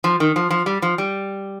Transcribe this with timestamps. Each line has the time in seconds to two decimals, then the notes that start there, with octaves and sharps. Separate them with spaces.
0.04 F3
0.20 D#3
0.36 F3
0.51 F3
0.66 G3
0.82 F3
0.98 G3